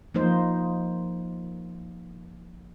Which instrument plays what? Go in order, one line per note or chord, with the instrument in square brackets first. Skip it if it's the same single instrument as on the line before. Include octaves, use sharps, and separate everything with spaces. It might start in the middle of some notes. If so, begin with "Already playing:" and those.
[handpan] F3 A#3 D#4 C5